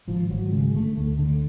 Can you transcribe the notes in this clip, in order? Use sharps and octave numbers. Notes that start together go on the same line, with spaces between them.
G#1 F3
G#1 F#3
C#3 G#3
D3 A3
D2 A3
D3